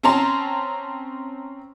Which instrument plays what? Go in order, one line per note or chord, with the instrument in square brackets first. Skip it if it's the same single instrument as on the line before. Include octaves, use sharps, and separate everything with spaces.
[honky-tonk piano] C4 C#4 A5 A#5 C6